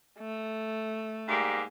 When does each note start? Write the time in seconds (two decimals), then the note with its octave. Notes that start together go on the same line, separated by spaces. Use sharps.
0.19 A3
1.28 G#2 G3 A#3